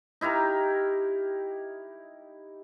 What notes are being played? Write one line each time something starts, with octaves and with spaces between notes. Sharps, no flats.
D#4 E4 G4 A#4